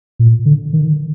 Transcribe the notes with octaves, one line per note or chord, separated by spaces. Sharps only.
A#2
D3
D#3